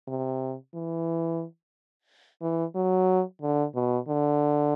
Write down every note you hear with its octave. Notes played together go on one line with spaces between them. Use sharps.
C3
E3
E3
F#3
D3
B2
D3